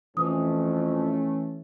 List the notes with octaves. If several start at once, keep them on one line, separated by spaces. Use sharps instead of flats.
F2 E3 A3 C#4 D#6